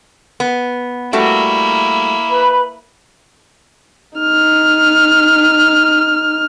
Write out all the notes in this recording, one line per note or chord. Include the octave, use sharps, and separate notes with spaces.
B3
G3 A3 A#3 E4 F#4
B4 B5
D#4 F6